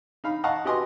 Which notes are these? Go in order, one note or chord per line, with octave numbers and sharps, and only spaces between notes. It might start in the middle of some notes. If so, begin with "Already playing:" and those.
D#4 F5 B5
D#5 F5 F#5 A5 A#5 C#6
F#4 G4 B4 D#5 G#5 C6